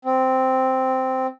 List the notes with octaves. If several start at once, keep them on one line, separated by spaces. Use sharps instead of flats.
C4